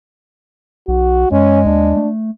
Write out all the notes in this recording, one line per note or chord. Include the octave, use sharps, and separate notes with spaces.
B1 F#4
F#2 G#3 C#4
D#2 D4
A3